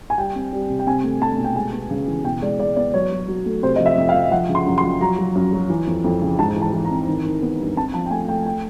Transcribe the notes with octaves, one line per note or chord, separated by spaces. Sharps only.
G#5
G3 G5
C4
G3
C3
G5
C4 G#5
A3
A3 A5
B2
G5
G#3 G#5
B3
C#3
E3
B2 G5
G#3 D5
G#3 D5
B3 D5
F#3 C#5
F#3
F#3
A3
C3 C5
F3 D#5
E5
F2
F5
F3
F3 F#5
C#3
C6
F#2
C6
F3
F#3 A#5
F#3
F#2
F#3
E3
F2
F2
C#3
G#2 A5
E3
A5
E3
A#5
C4
D#3
D#3
B3
G2
C4 A5
F3 A5
G5
A3 G#5
A3 G5
G5